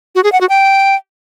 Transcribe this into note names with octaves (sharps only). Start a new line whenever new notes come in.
F#4
G#4
F#5
F#4
G5